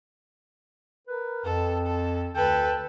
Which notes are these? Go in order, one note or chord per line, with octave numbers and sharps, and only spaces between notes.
A#4 B4
F2 A4
A4
D2 D3 A4 B4 G5